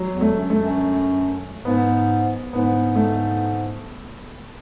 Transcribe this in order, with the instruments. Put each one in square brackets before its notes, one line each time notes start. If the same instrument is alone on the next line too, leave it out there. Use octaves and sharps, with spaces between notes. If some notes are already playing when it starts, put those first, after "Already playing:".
Already playing: [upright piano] F#3
[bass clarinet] E2
[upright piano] A3
[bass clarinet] F#2
[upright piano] A3
[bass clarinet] F#2
[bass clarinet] G#2 [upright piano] B3
[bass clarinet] G#2 [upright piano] B3
[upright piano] A3